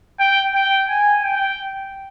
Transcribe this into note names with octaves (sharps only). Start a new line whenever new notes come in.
G5
G5
G#5
G5